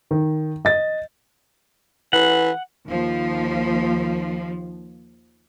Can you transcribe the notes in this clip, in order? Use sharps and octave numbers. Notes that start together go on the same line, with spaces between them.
D#3
D#5 A6
E3 F#5
D#2 F3